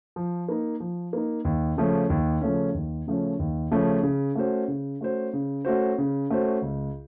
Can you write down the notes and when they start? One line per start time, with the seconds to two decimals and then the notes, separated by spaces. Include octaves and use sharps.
0.16 F3
0.48 A#3 D#4
0.80 F3
1.13 A#3 D#4
1.45 D#2
1.77 C#3 F3 A3 C#4
2.10 D#2
2.41 C#3 F3 A3 C#4
2.74 D#2
3.07 C#3 F3 A3 C#4
3.39 D#2
3.71 C#3 F3 A3 C#4
4.03 C#3
4.35 A3 C#4 F#4 C5
4.68 C#3
5.01 A3 C#4 F#4 C5
5.33 C#3
5.65 A3 C#4 F#4 C5
5.98 C#3
6.30 A3 C#4 F#4 C5
6.62 C#2